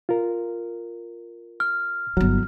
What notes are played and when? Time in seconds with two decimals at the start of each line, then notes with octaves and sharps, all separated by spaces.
0.09 F4 A#4
1.60 F6
2.17 G1 F#3 E4